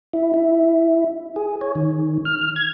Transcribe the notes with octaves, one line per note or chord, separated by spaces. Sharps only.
E4
E4
G#4
C#5
D#3
F6
G#6